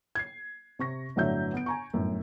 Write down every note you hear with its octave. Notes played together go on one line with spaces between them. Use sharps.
G#6 C7
C3 C#6 A#6
G1 A2 D3 F#3 E5 G6
B3 D7
G#5 A#5 C#6
G1 F#2 A2